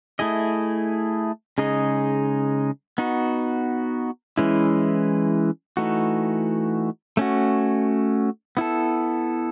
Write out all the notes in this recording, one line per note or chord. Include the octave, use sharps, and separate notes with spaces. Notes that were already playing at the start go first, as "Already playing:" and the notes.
A3 E4 G#4 D#5
C#3 G#3 D#4 G#4 D#5
B3 D#4 F#4
E3 G#3 C#4 E4 B4
E3 A3 D#4 F#4
A3 C#4 F#4
B3 E4 A4